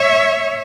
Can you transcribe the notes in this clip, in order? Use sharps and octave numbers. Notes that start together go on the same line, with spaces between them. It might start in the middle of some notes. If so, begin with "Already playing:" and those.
Already playing: C#5 E5